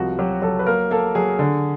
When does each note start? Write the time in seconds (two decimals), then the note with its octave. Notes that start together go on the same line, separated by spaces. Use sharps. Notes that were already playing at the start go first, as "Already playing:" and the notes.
Already playing: C2 F3 F#4
0.19 F#3 G4
0.42 F#3 A4
0.59 B4
0.66 A#3 A#4
0.91 A#3 A4
1.15 F#3 G#4
1.39 D3